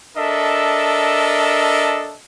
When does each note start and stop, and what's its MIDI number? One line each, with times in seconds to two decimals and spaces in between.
0.17 2.17 62
0.17 2.17 69
0.17 2.17 70
0.17 2.17 75
0.17 2.17 76